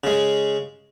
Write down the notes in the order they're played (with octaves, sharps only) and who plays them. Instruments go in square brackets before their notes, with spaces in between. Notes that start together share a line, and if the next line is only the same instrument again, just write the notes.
[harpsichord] C#3 G#3